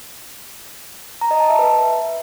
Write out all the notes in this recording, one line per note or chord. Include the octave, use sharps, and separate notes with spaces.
A#5
D#5
A5
E5
B4